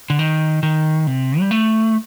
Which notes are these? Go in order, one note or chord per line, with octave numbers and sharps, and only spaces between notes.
D3
D#3
D#3
C3
G3
A3